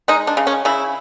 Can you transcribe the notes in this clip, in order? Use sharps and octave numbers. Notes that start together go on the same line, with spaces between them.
G#3 D#4
D4
C#3
C#4
C#3 E4